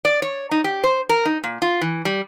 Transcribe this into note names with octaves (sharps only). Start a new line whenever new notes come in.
D5
C#5
D#4
G4
C5
A#4
D#4
A#2
F4
E3
G3